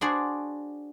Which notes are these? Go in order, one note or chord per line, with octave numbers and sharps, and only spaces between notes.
D4 F#4 G#4 C5 D5